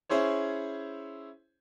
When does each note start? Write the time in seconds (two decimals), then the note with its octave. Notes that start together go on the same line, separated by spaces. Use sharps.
0.09 C#4 E4 G#4 C5 C#5